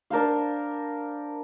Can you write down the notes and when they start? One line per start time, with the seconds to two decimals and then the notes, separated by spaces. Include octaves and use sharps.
0.10 D4 A#4 C5 F5